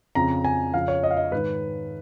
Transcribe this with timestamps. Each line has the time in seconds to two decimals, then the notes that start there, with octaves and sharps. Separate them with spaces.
0.15 F2 C#3 F3 A#5
0.45 G#5
0.74 F2 C#3 F3 F5
0.88 C#5
1.03 D#5
1.11 F5
1.17 D#5
1.32 G#2 D#3 B4